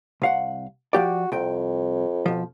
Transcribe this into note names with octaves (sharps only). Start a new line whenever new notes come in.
C2 F5 F#5
F3 F#4 G4 D5
C2 F2 G5
B2 F3